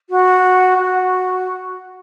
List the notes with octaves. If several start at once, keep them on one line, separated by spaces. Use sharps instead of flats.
F#4
F#4